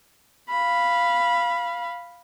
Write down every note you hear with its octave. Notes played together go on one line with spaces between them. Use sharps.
F5 B5